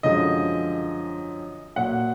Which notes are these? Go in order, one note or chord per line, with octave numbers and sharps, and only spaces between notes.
F#2 D3 F3 G#3 D#5
A#2 F#3 F#5